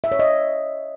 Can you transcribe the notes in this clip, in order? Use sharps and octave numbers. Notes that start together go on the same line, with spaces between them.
E5
C#5
D#5